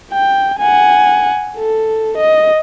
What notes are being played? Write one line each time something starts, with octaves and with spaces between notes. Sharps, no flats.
G5
F#5 G#5
A4
D#5